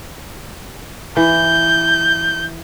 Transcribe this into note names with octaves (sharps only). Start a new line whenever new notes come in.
E3 G6